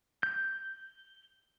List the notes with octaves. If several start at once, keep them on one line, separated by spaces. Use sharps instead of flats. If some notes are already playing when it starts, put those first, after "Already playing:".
G6